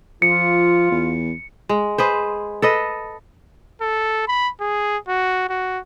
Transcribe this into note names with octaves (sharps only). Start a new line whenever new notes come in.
F3 F4 C#7
E2
G#3
G#4 B4 C5
A4 B4 D#5
A4
B5
G#4
F#4
F#4